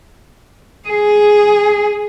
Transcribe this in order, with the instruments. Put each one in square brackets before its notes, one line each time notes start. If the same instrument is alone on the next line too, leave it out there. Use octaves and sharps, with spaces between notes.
[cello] G#4